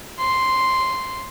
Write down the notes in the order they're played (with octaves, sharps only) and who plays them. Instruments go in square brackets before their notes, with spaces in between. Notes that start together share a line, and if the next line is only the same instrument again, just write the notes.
[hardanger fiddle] C6